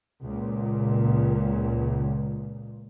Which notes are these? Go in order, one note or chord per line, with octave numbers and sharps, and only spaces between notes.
C#2 A#2